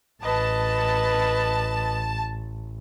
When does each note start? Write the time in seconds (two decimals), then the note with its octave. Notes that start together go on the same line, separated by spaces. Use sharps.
0.23 A1 B4 D#5 A5